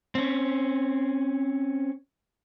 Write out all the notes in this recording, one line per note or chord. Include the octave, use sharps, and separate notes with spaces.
C4 C#4